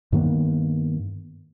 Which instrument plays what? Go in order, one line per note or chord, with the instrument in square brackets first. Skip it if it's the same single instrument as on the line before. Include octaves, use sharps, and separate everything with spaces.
[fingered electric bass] G2 D#3 A#3 B3